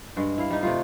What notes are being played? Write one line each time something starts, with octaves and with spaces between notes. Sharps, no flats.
G2 G#3
E4 F5
G3 D#4
C3 A3 F4